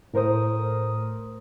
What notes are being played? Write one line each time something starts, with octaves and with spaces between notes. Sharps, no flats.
A2 A#4 C5 D#6